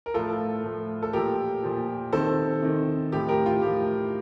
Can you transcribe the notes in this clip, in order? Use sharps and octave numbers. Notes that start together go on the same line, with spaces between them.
A#4
A2 F3 F4 A4
A2 F3
A4
A#2 F3 G4 A#4
A#2 F3
C3 D#3 A4 C5
C3 D#3
A2 F3 G4
G4 A#4
F4
A2 F3 G4